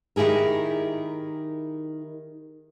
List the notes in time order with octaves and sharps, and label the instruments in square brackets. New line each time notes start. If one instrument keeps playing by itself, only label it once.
[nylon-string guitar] D#3 E4 G4 G#4 A#4